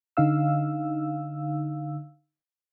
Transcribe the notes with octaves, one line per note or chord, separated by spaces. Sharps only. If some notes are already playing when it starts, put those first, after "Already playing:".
D3 D#4 F5 E6